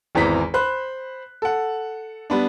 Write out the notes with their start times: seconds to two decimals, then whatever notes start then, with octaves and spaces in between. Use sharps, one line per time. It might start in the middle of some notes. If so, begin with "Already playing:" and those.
0.15 G#1 E2 E3 C4 A#5 B6
0.54 C5 B5 F#6
1.42 A4 F#5
2.30 G3 B3 D4